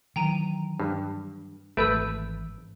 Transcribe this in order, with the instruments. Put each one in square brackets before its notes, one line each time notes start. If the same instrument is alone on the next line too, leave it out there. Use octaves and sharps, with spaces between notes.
[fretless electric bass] D#3 E3 F#3 [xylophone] G5 A#5 D#7
[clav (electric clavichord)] G2
[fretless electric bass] G#1 E3 [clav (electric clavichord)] A3 B4 [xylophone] E6 G6 D7